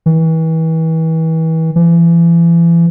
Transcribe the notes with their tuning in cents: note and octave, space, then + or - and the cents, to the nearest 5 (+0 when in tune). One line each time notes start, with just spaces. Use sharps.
E3 -35
E3 +35